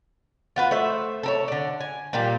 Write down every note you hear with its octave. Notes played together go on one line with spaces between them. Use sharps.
F4 F#4 B4
A3 C5 E5
A4 A#4 C#5
D3 D5
G#5
A#2 G3 A#3 G4